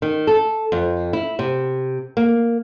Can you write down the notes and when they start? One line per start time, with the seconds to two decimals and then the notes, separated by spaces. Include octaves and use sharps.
0.02 D#3
0.27 A4
0.72 F2
1.13 E4
1.39 C3
2.17 A#3